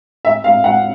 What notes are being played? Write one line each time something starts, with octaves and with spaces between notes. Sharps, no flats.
E5
F5
F#5